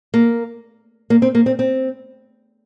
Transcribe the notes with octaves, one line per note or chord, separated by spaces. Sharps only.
A#3
A#3
C4
A#3
C4
C4